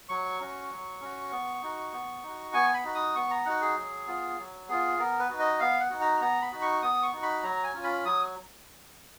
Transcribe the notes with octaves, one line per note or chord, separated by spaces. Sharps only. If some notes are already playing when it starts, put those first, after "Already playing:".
F#3 C#6
C#4 F#4
F#3
C#4 F#4
B3
D#4 F#4
B3
D#4 F#4
B3 G#5
B5
D#4 F#4
D#6
B3 C#6
A#5
D#4 F#4 F#5
G#4
F#3
B3 F4
F#3
B3 F4 G#4
B3 A#4
B4
D#4 F#4
D#5
B3 F5
F#5
D#4 F#4
A#5
B3 A#5
B5
D#4 F#4
C#6
B3 D#6
C#6
D#4 F#4
B5
F#3 A#5
G#5
C#4 F4
B5
F#3 D#6